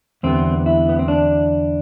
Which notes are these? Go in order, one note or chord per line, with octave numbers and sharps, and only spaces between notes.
E2 D3 G3 B3 C4
E4
B3
C4
D4